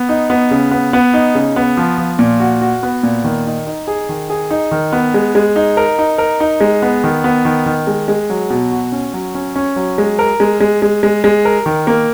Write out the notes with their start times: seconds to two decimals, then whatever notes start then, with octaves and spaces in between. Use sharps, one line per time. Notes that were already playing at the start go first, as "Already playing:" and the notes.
Already playing: B3
0.09 D#4
0.30 B3
0.51 C#3
0.71 B3
0.93 B3
1.14 D#4
1.35 C#3
1.56 B3
1.77 F3
1.98 F3
2.19 A#2
2.40 F#4
2.61 F#4
2.83 B3
3.03 A#2
3.24 D#3
3.46 D#4
3.67 D#4
3.87 G#4
4.09 D#3
4.30 G#4
4.51 D#4
4.71 D#3
4.92 B3
5.14 G#3
5.35 G#3
5.56 D#4
5.77 A#4
5.98 D#4
6.18 A#4
6.40 D#4
6.61 G#3
6.82 B3
7.04 D#3
7.24 B3
7.45 D#3
7.66 D#3
7.87 G#3
8.08 G#3
8.30 F#3
8.50 B2
8.72 F#4
8.92 C#4
9.13 F#3
9.35 C#4
9.56 C#4
9.76 F#3
9.98 G#3
10.19 A#4
10.40 G#3
10.61 G#3
10.82 G#3
11.03 G#3
11.24 G#3
11.45 A#4
11.66 D#3
11.87 A#3